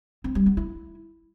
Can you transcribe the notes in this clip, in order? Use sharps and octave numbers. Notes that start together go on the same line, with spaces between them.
C4
G3
B3
E4